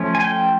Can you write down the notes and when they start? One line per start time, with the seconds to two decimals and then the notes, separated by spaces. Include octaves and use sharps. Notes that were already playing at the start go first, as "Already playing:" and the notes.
Already playing: F3 A3 C#4
0.15 G#5
0.21 G5